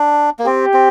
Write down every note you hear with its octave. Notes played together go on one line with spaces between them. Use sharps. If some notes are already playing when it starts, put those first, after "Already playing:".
Already playing: D4
A#3
C4 G4
C4